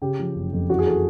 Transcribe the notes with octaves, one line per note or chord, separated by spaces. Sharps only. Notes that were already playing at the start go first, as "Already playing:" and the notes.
C#3 G4
F3
F#1
F2
E3 F#4
G#4
A4